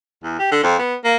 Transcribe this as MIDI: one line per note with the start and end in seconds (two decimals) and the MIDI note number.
0.23 0.35 40
0.39 0.50 67
0.51 0.61 50
0.63 0.78 41
0.79 0.94 59
1.04 1.17 58